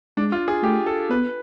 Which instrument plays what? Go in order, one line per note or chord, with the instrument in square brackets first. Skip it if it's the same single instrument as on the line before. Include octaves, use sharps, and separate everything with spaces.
[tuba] G#3 [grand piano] D4
[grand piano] F4
G#4
[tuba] A3 [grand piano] G4
[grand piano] A4
[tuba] B3 [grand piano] B4